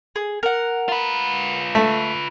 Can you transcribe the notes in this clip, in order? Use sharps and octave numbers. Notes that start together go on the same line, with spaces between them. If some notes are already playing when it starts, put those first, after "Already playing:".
G#4
A#4 F#5
F4 B4
A3